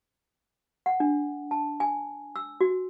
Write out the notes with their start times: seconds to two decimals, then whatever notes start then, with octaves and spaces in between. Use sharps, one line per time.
0.86 F#5
1.00 D4
1.51 A5
1.80 G#5
2.36 E6
2.61 F#4